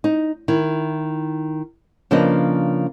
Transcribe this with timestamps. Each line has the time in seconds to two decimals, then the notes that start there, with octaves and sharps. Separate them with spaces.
0.04 D#4
0.48 D#3 E4
2.11 C#3 F3 A#3 D4 B4 D#5